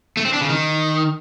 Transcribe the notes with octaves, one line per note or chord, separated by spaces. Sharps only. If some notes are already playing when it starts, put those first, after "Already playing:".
A3
C4
D4
C#3
D#3